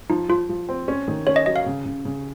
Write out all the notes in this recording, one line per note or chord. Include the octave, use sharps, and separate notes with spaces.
F3 D#4
F3 F4
F3
C4
C#4
D#3
C#4 C#5
D#5
F#3 D#5
F5
C#3
C#3
C#3